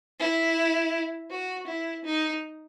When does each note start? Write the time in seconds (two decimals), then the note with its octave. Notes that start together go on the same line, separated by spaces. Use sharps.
0.20 E4
1.31 F#4
1.67 E4
2.05 D#4